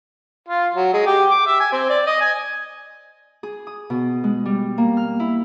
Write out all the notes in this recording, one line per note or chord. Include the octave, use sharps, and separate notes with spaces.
F4
F#3
G#3
G4
D6
E5
G#5
C4
D5
D#5
G#5
G#4
D#6
B2
G#3
G3
A#3
F6
E4